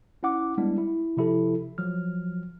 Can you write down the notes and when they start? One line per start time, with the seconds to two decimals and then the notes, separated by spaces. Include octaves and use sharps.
0.23 C#4 E4 F#5 D6
0.58 G3 G#3 B3 D4 E4
0.78 E4
1.17 C3 F3 E4 G4 A4
1.78 F3 F#3 F6